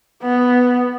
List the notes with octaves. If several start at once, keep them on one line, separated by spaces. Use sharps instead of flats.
B3